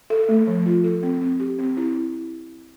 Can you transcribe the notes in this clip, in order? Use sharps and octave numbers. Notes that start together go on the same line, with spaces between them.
A4
A3
F3
F4
A4
C4
C4
G4
C4
E4